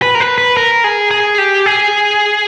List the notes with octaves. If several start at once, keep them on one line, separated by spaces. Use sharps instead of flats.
B4
A#4
B4
B4
A#4
G#4
G#4
G4
G#4